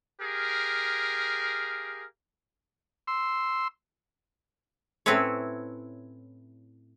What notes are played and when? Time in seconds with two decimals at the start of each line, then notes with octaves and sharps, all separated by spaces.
0.21 G4 G#4 A#4 F5
3.07 C6 E6
5.06 A2 C4 C#4 E4 B4 C#5